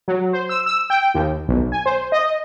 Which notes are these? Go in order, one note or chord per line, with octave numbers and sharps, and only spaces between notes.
F#3
C5
E6
E6
G5
D#2
B1
G#5
C5
D#5